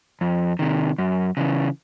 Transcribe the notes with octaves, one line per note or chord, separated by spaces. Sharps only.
F2
C3 D#3
F#2
C#3 E3